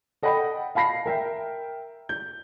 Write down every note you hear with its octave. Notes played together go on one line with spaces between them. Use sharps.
A4 D#5 F#5 G5 B5
F5 A5 B5 A#6 C7
A#4 E5 G5
G6